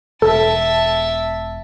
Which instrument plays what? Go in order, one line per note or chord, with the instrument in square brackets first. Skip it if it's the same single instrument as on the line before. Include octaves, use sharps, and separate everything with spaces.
[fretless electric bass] E1 [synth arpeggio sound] A4 [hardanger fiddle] E5 A5